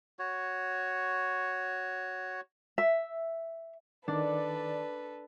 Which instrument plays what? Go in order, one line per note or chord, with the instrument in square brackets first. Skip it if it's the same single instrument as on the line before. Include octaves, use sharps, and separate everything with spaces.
[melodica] F#4 C#5
[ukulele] E5
[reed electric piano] D#3 [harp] D4 [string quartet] A4 B4 [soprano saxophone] D5